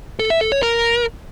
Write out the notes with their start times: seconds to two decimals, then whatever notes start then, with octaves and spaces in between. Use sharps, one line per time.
0.19 A4
0.30 E5
0.41 A4
0.52 C#5
0.63 A#4